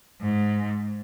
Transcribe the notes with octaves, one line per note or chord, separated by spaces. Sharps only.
G#2